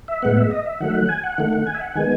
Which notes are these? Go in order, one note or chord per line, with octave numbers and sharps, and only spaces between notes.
E5
A2 G#3 B3 F#5
E5
D#5
E5
D#3 F#3 A3 F#5
E5
F#5
G#5
F#5
D#3 A3 F#5
F#5
G#5
E5
F#5
D#3 G#3 B3 G#5